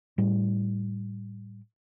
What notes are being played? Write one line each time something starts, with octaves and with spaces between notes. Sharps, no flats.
A2 G3